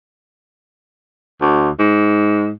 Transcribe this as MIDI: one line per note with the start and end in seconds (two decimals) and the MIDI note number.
1.41 1.70 38
1.79 2.52 44